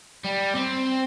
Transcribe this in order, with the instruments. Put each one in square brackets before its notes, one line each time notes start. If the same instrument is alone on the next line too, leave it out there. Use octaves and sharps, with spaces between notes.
[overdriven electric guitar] G3
C4